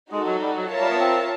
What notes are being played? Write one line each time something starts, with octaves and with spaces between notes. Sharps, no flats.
G#3 D#4 F#4 A4
F#3
G3
F#3
F4 A#4 C#5 E5 A5
G3
B3
C4